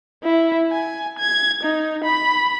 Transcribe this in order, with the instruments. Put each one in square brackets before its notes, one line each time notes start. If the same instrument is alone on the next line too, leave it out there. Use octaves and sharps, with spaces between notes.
[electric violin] E4
G#5
G#6
D#4
B5